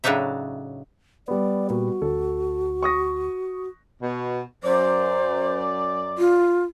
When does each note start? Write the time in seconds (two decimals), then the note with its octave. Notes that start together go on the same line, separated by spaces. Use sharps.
0.04 A2 C#3 F#3 D4 D#4 E5
1.28 G3 B3 D5
1.70 A#2 F#4
2.02 D2 A4
2.83 C#6 D#6 A#6
4.01 B2
4.64 F#2 C5 D5
6.18 F4